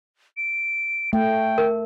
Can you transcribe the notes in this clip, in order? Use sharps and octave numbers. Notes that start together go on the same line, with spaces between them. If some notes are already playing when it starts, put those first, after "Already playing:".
D7
A3 G5
A#4